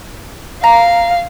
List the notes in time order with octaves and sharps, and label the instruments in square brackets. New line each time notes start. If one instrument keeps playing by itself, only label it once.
[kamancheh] F5 [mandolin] A#5